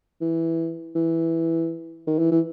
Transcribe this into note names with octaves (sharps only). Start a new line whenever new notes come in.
E3
E3
D#3
E3
E3